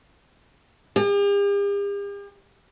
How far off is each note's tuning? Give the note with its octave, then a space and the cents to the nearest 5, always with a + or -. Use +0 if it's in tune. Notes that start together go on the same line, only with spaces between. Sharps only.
G4 +45